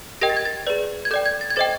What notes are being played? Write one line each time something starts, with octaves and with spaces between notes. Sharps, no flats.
G4 A#4 D#5 G5 A#6
A6
G#6
A6
G#4 B4 D5
G#6
A4 D5 G5 G6
G#6
A6
G#6
A4 C5 D#5 G5 A6